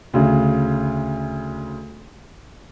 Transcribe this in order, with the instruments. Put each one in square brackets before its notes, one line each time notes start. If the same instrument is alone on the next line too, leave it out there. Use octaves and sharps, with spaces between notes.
[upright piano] D2 C#3